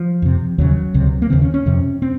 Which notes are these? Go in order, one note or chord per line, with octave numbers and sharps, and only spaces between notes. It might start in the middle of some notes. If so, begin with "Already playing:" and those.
Already playing: F3
F2 C3
D#2 C#3 F#3
C#2 C3
A#3
D#2 C#3 C4
C#4
C#4
F2 C3
C4